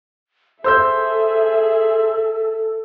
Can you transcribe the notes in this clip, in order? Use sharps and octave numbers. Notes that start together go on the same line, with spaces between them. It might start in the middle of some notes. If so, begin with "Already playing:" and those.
G#4 A4 C5 E5 E6 G6